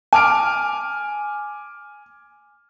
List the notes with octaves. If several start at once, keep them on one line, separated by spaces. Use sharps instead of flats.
G#5 D6 F6 D7